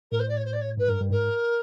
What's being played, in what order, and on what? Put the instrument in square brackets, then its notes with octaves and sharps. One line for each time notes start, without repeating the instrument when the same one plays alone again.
[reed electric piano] A2 [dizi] A#4
[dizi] C5
D5
C#5
C5
D5
C#5
[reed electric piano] G#2 [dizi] B4
[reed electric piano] G2 [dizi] A#4
[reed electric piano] G2
[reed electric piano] G#2 [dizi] A#4